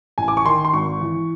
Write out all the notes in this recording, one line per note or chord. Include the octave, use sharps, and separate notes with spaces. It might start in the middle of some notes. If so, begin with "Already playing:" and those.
A1 G#5
D6
C#6
D#3 C6
C6
G#1 C#6
E3